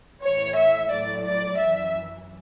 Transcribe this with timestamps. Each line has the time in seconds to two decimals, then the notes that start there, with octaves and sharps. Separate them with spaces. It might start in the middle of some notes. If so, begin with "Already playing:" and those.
0.24 A2 E3 C#5
0.58 E5
0.92 A2 F#3 D5
1.25 D5
1.59 F#2 E3 E5